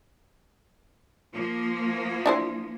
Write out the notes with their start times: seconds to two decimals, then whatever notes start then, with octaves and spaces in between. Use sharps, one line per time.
1.34 F3 A#3
2.26 D4 E4 C5